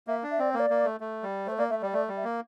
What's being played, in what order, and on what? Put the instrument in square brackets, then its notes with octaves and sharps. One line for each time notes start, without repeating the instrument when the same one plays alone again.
[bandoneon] A#3 [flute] E5
[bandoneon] D4
[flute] E5
[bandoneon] C4 [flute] D5
[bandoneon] A#3 [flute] C5
[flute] D5
[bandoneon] A#3
A3
A3
G3
[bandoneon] A3 [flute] C5
[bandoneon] A#3 [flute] D5
[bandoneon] A3 [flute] E5
[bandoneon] G3 [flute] D5
[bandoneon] A3 [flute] D5
[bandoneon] G3
[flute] E5
[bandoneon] A#3